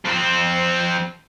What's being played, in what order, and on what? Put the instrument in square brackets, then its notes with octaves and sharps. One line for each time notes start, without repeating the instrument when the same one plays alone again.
[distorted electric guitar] F2 C4